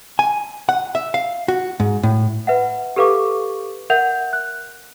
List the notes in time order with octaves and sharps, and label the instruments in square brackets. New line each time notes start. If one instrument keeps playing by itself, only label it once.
[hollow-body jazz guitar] G#5
F#5
E5
F5
F#4
G#2
A2
[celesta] B4 E5 F#5
G4 A4 B4 F5 C#6 D6
A#4 E5 F#5 G6 F7
F#6